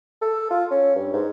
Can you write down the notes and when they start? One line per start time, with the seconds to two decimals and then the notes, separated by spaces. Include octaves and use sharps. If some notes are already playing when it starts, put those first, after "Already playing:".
0.22 A4
0.50 F4
0.71 C#4
0.95 G2
1.13 G#2